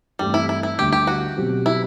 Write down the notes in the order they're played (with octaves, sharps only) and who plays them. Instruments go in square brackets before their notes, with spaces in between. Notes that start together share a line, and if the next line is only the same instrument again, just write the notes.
[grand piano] G2 E3 A3 C4 [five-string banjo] G3
[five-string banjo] E4
E4
E4
[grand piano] D2 D3 G3 [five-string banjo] G4
[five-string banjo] G4
F#4
[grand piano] B2 F#3 C4 G4
[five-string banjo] E4